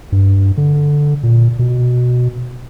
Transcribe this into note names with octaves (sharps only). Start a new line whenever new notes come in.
G2
D3
A#2
B2